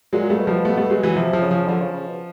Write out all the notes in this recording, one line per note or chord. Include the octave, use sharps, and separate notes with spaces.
A#2 F#3 G#3
G3 A3
B2
F3 G3
A3 B3
G3 A3
F#3 G#3
E3 F#3
C3 F3
F3
C#3
F3
D3 F3
C#3
C#3
B2